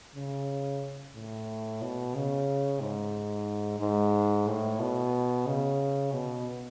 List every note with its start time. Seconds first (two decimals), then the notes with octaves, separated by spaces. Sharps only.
0.15 C#3
1.15 A2
1.82 B2
2.15 C#3
2.81 G#2
3.80 G#2
4.47 A2
4.80 B2
5.46 C#3
6.12 B2